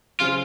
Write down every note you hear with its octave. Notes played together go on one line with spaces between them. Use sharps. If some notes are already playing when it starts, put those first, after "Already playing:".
C#3 F#3 C4 F4